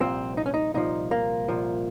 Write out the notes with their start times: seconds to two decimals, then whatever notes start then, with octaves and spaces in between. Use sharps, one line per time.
0.01 C2 A#2 F3 C4
0.37 D#4
0.46 C#4
0.54 D#4
0.74 C2 A#2 F3 D#4
1.11 A#3
1.48 C2 A#2 F3